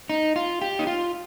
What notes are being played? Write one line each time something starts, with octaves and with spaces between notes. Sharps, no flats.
D#4
F4
G4
D#4
F4